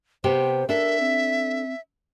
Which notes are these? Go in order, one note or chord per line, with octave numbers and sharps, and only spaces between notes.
C3 B3 G4 C5
D4 A4 A#4 E5
C4